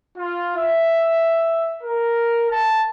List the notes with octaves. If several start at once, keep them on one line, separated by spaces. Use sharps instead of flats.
F4
E5
A#4
A5